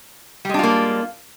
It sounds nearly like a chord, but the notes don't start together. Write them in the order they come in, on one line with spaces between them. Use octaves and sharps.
G3 G#3 D4 F4 A#3